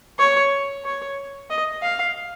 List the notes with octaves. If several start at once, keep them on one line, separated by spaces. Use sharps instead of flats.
C#5
C#5
D#5
F5